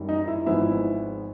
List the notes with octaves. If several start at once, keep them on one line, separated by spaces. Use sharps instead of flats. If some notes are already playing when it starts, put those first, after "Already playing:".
Already playing: F#2 D#3 G3
D#4
E4
G#1 G#2 F3 G#3 B3 E4